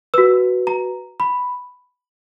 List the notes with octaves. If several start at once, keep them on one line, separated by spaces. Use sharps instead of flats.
F#4 B4 E6
A#5
B5